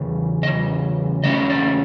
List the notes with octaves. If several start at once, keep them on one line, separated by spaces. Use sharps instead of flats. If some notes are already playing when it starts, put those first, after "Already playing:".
Already playing: E2 C#3
D#5
E2 C#3
E2 C#3 F#3 A3 C#4 D#5
D5